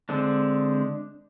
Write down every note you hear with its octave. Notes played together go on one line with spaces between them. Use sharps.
D3 G#3 C4 D4